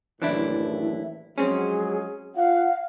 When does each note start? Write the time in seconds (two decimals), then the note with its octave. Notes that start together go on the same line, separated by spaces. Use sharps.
0.22 F#1 D#2 A2 E3 D4 E4
1.38 F3 F#3 G#3 C4 C#4 G#4
2.37 F4 F5 F#5